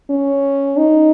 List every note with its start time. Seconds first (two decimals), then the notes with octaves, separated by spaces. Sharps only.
0.10 C#4
0.78 D#4